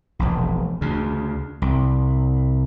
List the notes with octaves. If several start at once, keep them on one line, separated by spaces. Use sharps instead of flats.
E1 A#1
D2 C#3
C2